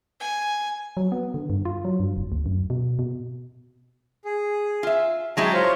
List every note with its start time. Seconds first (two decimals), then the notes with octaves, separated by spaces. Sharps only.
0.20 G#5
0.97 F#3
1.12 B3
1.34 D3
1.50 G2
1.65 F4
1.85 F#3
2.00 G2
2.17 F#1
2.32 D2
2.46 F#2
2.70 B2
2.99 B2
4.25 G#4
4.83 F4 E5
5.37 F#3 G#3 E4 G5 A5 A#5
5.53 F4 C5 C#5